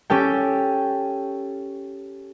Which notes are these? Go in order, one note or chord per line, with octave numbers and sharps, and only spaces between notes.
C#4 G4 A4 G5